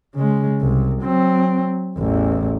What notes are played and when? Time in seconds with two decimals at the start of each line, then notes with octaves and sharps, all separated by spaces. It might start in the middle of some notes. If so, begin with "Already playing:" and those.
0.15 C#3 G#3
0.61 C2
1.03 F#3 C4
1.97 A1 E2